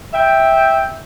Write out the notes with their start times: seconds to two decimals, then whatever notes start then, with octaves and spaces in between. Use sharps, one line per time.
0.14 E5 G5